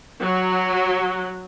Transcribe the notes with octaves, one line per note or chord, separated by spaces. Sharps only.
F#3